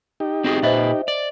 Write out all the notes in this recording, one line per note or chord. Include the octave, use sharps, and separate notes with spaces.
D#4 G4
C4 F#4 G#4
A#2 B4 C5 D#5 E5
D5